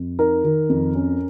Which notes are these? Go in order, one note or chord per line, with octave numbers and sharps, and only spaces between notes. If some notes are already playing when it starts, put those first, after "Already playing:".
Already playing: F2
D#4 A#4
D#3
F2
C#4